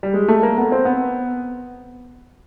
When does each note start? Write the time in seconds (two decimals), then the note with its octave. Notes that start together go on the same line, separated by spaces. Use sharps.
0.03 G3
0.14 G#3
0.28 A3
0.43 A#3
0.58 B3
0.72 C4
0.85 B3